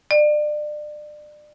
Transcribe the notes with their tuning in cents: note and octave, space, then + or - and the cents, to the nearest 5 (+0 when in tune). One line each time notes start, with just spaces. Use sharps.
D5 +30